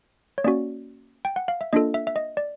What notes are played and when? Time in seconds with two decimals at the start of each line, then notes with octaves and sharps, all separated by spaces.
0.38 C#5
0.44 A#3 C#4 F#4 D5
1.25 G5
1.36 F#5
1.48 F5
1.61 E5
1.73 A#3 D4 F4 A4 D#5
1.94 E5
2.07 E5
2.16 D#5
2.37 D5